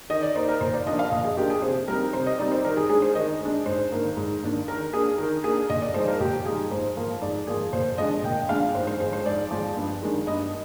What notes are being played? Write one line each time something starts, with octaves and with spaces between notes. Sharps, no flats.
D#3 D#5
D5
A#3 D#4 C5
A#4
A#2 C5
D5
F3 A#3 D4 D#5
F5
A#2 D#5
G#4
F3 A#3 D4 G4
G#4
C3 C5
G3 C4 D#4 A#4
C3 C5
D#5
G3 C4 D#4 D5
C5
D#3 A#4
G#4
G#3 D4 G#4
C5
D#3 D#5
G#3 D4
G#2 C5
D#3 A#3 D4
G#2
D#3 A#3 D4
D#3 A#4
A#3 D4 G#4
D#3 A#4
A#3 D4 G#4
A#2 D#5
D5
F3 G#3 D#4 C5
A#4
A#2 G4
F3 G#3 D#4 G#4
G#2 C5
F3 A#3
G#2 D5
F3 A#3 G#4
A#2 C5
F3 G#3 D4 D#5
A#2 G5
F3 G#3 D4 F5
G#2 C5
C5
F3 G#3 C5
C5
G#2 D5
F3 G#3
G2
D#3 G#3 D4
G2 D#5